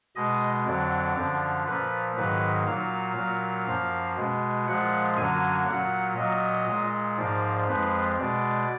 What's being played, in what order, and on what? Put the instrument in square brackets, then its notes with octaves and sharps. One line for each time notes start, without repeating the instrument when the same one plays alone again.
[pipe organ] B2 G#3 D#5
F2 D3 F#3 D5
F#2 D3 F3
A#2 F3 A#3 B4
G#2 D#3 F#3 A#3 B4
A#2 F#3 A#3 F5
A#2 F#3 A#3
F#2 F3 A#3
B2 G#3
A#2 F3 G#3 F#5
F#2 D3 F#3 A#3 G#5
A#2 F#3 A#3 F#5
A#2 F#3 A#3 D#5
A#2 G#3
G#2 F3 A#3 D5
F2 F3 G#3 B4
B2 G#3 D5